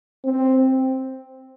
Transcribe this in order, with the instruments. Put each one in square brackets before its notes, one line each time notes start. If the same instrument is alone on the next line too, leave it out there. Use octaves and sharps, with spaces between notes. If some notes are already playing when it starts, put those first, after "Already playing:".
[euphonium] C4